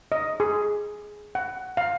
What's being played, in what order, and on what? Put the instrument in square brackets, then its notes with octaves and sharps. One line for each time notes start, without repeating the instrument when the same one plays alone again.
[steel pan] D#5
G#4
F#5
F5